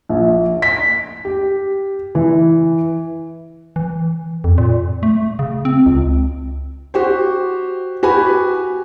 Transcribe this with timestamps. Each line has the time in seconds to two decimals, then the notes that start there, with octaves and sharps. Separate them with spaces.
0.09 A#1
0.62 B6
1.25 G4
2.15 E3
3.76 E3
4.44 F2
4.58 A#2
5.03 A3
5.39 C#3
5.65 C4
5.86 C#2
6.94 F#4 G4 C5
8.03 F#4 G4 B4 G#5 B5